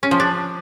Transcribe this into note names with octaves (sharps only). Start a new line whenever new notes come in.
C#4
F3
D4